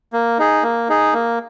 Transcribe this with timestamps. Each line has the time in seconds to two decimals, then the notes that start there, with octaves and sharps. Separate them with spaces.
0.13 A#3
0.38 D#4 G#4
0.63 A#3
0.89 D#4 G#4
1.14 A#3